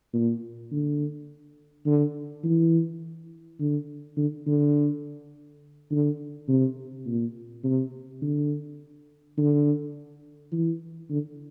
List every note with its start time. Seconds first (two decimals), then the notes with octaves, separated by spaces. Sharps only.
0.13 A#2
0.71 D3
1.86 D3
2.44 E3
3.60 D3
4.17 D3
4.46 D3
5.91 D3
6.48 C3
7.06 A#2
7.64 C3
8.22 D3
9.37 D3
10.52 E3
11.10 D3